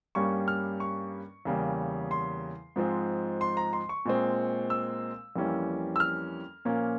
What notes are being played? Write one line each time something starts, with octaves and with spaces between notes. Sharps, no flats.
G2 G3 A#3 C#4 C#6
F6
C#6
E2 C#3 G3 A#3
C6
G#2 F3 G#3 C4
C6
A#5
C6
C#6
A#2 G#3 C4
E6
F2 E3 G3 A#3 C#4
E6
F6
A#2 F3 A#3 C#4